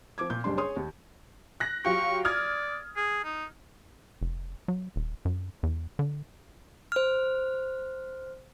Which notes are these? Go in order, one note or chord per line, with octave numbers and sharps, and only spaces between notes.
F3 C4 D6 G#6
A#2 G6
F#1 G3 D4 C6
G#4 C#5 C6 D#6
D#2
F#6 A#6
F#3 F4 G4 C#6
D5 D#6 F6 G#6
G#4
D#4
F1
F#3
D#1
F#2
E2
D3
C5 F6